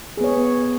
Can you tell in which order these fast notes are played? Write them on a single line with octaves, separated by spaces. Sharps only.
G#4 B3 C#5